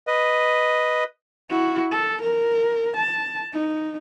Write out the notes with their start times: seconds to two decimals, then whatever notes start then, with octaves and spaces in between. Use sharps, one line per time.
0.07 B4 D#5
1.50 E4 F#4
1.91 A4
2.22 A#4
2.97 A5
3.53 D#4